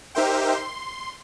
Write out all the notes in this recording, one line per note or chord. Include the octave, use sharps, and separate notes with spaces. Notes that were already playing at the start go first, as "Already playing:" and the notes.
D#4 G4 A#4 C5 E5 G5
C6